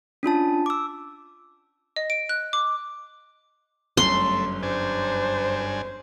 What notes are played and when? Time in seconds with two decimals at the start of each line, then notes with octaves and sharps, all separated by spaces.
0.23 C#4 D4 F4 A5
0.66 D6 E6
1.96 D#5
2.10 D7
2.29 F#6
2.53 D6
3.97 G1 F#2 A3 C6
4.63 G2 D4 C5 G#5